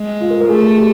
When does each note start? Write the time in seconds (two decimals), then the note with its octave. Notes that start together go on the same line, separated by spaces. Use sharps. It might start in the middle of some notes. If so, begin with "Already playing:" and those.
Already playing: G#3
0.21 F4
0.30 A#4
0.41 A#4
0.49 A3 G#4
0.78 G4